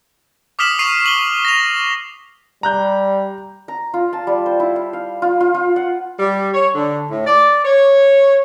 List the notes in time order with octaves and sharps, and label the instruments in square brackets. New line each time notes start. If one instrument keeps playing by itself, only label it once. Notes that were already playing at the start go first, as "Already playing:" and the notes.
[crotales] D6 D#6 F6 B6 E7 F#7
C#6 C7 D#7 F7
F#7 G7
A#6 F7
[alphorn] G3 [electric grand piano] A#5 F#6 G6
[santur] A#5
F4
A5
G3
C5
E4
F5
F5
F4
F4
F4
F#5
[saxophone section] G3
C#5
D3
A2
D5
C#5